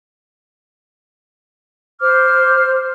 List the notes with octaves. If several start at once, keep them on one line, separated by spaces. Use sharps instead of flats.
C5 D6 F6